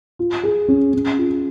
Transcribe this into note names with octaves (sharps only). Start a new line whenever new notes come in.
F4
G#4
C#4
C#4
F4